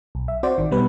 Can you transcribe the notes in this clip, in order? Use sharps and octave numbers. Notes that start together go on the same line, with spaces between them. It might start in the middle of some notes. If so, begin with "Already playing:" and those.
B1
E5
C4 F#4 C5 D5
A1 D#3
B2 G3 B3 B4